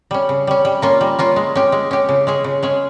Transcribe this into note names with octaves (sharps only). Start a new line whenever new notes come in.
G3 C#4
C#3
G3 C#4
G3
A#3 C#4 F4
G3
A#3 C#4 F4
G#3
C#4 G4
G#3
C#4 G4
C#3
G#3 C#4 G#4
C#3
G#3 C#4 G#4